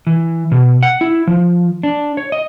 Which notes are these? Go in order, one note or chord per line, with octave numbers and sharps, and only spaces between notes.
E3
B2
F#5
E4
F3
D4
C#5
D#5